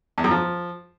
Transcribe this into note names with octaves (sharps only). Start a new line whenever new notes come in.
E2
F#2
F3